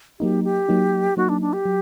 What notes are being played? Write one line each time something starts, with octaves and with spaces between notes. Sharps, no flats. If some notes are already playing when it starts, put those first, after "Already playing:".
F#3 A#3 D#4 G4
G4
F#3 A#3 D#4
F#3 A#3 D#4 F#4
D4
D4
G4
F#3